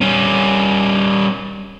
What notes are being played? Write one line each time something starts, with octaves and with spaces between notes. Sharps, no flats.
G3 C#4